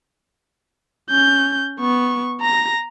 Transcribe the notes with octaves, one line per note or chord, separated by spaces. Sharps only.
C#4 G6
B3 C#6
A#5 A#6